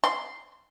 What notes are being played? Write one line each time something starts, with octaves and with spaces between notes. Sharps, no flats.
C6